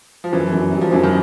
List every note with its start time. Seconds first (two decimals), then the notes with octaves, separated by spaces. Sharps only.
0.24 F3
0.33 F#2 E3
0.53 F#2
0.71 F#3 G3
0.81 F3
0.92 F#2 E3
1.03 D#3